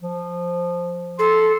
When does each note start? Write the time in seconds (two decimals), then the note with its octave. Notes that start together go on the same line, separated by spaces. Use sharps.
0.02 F3
1.19 A4 C6